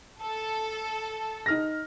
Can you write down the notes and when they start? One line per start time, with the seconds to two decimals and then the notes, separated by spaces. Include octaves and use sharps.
0.22 A4
1.46 D#4 F6 A#6